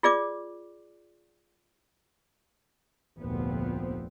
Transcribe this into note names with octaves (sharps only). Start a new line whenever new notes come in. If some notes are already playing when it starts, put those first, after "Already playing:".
F4 G#4 D5 D6
F1 D2 A#2 F3 B3 C4